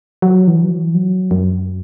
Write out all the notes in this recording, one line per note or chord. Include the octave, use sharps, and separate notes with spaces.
F#3
E3
F#3
E3
F#3
F#2